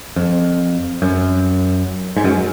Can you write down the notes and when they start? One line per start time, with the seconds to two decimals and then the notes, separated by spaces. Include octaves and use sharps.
0.16 F2
1.02 F#2
2.16 G#2
2.24 F#2